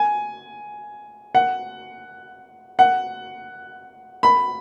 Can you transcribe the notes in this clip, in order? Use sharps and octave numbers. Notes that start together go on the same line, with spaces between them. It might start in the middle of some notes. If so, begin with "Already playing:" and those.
Already playing: G#5
F#5
F#5
B5